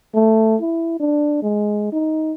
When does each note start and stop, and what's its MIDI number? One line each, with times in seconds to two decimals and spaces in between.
0.15 0.57 57
0.62 1.00 64
1.00 1.40 62
1.43 1.91 56
1.93 2.34 63